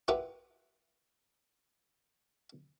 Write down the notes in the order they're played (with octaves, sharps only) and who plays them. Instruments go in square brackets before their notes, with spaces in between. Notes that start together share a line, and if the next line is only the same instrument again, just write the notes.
[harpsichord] E4 F4 G4 A#4 B4 F#5